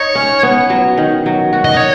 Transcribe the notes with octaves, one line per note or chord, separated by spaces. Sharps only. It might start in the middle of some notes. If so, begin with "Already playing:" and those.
Already playing: D#4 C#5
C#4
B3
F#3
D#3
F#3
F#4
D#5
D#4 C#5